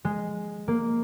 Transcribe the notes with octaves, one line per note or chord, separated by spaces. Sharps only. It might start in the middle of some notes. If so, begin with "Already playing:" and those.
G#3
A#3